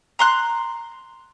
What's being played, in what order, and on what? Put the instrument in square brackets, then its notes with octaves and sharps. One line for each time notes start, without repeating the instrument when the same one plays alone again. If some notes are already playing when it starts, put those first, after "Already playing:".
[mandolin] A#5 C6 F#6